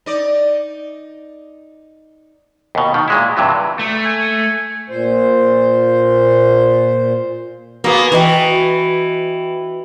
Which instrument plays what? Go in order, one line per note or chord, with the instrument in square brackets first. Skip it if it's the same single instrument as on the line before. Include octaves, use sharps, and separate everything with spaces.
[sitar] D#4 D5
[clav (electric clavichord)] D#2 B2
B2 D#3
A#2 G#3 E4
G2 C3 E3 F#3
[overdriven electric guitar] A3
[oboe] G#5
[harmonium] A#2 C5
[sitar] A#3 B3 [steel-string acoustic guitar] F#4 G#4
[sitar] E3 [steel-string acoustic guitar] F#4 D#5 G5